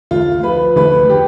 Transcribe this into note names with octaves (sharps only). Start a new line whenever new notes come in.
D2 F4
F3 B4
D2 B4
G4